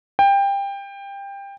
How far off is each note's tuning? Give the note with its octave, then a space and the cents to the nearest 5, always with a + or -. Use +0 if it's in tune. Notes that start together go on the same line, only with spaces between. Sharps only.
G5 +20